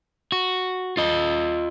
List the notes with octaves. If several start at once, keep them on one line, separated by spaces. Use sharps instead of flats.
F#4
F4 D#5